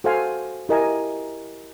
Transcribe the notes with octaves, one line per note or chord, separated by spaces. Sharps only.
F#4 A4 C5 F5 G#5
E4 G4 A#4 D#5 G#5